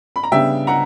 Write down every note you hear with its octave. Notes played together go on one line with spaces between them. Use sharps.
B5
A#5
C#3 G3 B3 D4 E5 G5
F#5 A#5